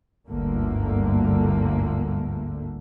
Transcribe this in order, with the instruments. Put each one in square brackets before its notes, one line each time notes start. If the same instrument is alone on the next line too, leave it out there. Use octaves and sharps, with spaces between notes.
[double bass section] G1 D2 G#2 D3 A3 A#3